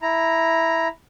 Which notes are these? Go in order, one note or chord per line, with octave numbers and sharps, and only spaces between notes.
E4 A#5